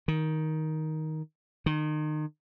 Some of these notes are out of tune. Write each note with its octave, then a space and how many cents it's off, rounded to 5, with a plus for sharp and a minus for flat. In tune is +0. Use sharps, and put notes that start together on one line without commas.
D#3 +10
D#3 -30